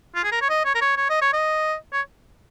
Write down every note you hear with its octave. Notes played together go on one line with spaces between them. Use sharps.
F4
G#4
A#4
C#5
D#5
C#5
A#4
C#5
C#5
D#5
C#5
D#5
C#5